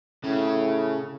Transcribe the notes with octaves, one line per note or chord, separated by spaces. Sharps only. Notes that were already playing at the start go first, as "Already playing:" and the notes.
A2 C#3